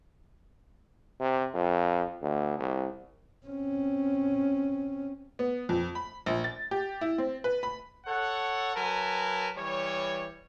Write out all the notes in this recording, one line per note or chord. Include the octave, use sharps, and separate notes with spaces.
C3
F2
D2
C2
C4 C#4
B3
F2
B5
A#1
A6
G4
E4
C4
B4
B5
A4 C#5 F#5
F#3 A#4 B4 G#5 A5
E3 G3 C#5